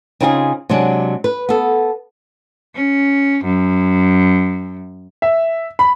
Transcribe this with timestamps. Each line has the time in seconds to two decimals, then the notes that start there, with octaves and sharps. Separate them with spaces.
0.20 C#3 C4 D#4 F4 F#4 G#4
0.69 C3 F#3 G#3 D4
1.24 B4
1.49 B3 A4
2.75 C#4
3.44 F#2
5.22 E5
5.79 B5